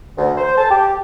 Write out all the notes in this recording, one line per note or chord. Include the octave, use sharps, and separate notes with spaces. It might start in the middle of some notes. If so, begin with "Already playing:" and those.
D2
C5
A5
G4